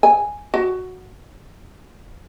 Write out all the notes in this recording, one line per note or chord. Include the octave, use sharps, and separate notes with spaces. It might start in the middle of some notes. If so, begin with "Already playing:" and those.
G#5
F#4